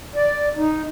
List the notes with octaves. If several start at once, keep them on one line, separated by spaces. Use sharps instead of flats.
D5
D#4